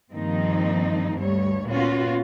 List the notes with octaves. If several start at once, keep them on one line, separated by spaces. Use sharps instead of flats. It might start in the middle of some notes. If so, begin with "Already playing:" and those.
G2 D#3 F3 A#3 C4 D#4
D2 G2 G3 C#5
A#2 B3 C#4 F4 F#4